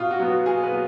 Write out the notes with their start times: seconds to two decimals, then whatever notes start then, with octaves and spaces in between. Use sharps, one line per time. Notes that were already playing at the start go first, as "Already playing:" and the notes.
Already playing: B2 F4
0.11 F#4
0.20 F#3 B3
0.28 F#4
0.46 B2 G#4
0.63 B4
0.72 F#3 B3